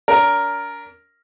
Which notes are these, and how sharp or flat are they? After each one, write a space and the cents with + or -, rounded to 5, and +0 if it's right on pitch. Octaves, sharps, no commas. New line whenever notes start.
D4 -40 A#4 +0